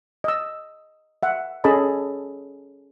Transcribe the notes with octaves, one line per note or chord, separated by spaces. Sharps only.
D#5 E6
E5 F#5
C#4 G#4 A4 D#5 A5 B5